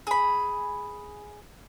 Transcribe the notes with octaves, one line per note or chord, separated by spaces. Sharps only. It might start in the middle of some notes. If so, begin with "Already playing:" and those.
G#4 B5